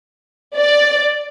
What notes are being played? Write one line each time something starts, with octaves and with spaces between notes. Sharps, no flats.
D5